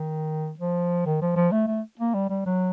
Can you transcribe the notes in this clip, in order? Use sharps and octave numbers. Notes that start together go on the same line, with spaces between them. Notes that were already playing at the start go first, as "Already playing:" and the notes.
Already playing: D#3
F3
D#3
F3
F3
A3
A3
A#3
G3
G3
F#3